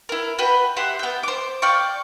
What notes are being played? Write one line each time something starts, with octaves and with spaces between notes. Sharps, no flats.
E4 A#4
F#4 B4 G5 B5
G4 E5 F#5 C6
B3 G5
C5 D6
D5 F5 G5 C#6